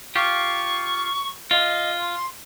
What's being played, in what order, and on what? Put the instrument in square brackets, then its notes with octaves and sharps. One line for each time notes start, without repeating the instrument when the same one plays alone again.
[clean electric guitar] F4 G4 [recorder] C#6
[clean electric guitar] F4 [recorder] D#5
[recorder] C6